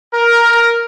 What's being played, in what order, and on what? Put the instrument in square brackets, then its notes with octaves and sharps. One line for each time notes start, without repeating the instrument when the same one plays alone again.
[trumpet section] A#4